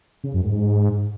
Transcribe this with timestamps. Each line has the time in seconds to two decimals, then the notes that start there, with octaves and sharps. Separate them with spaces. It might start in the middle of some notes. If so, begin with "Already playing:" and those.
0.24 C#3
0.34 F#2
0.44 G#2